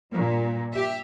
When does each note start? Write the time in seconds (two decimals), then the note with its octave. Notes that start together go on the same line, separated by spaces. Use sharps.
0.12 G2 A#2
0.73 G4 E5